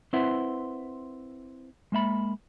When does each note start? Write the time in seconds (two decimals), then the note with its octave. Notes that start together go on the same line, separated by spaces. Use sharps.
0.13 C4 E4 B4 C5 E5 F#5
1.92 G#3 A#3 E5 B5